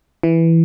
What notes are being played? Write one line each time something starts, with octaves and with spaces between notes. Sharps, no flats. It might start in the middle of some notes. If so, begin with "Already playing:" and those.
E3